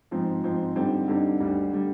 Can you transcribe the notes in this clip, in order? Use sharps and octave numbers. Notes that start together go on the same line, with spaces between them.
G#2 F3 C4
G#2 F3 C4
D3 G3 C4 D#4
D3 G3 C4 D#4
D2 D3 G3
D3 G3